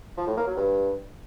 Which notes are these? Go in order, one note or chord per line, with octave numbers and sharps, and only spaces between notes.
F3
A2
A#3
F#3
G2